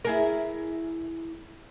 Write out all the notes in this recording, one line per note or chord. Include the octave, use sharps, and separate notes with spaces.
E4 G#4 A#4